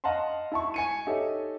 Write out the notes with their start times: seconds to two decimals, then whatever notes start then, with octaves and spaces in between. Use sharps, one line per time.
0.04 D#5 F5 F#5 A5 A#5 C6
0.52 E4 A5 C#6
0.74 G#5 C#7 D#7
1.07 D#4 G4 A4 C#5 E5